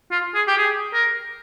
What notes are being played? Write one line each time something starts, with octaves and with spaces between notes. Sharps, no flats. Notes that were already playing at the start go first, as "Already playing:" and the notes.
F4
G#4
G4
G#4
A#4